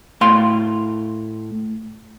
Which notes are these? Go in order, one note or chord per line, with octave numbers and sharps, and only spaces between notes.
A2 F5 C6